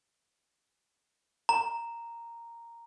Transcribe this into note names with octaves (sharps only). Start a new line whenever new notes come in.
A#5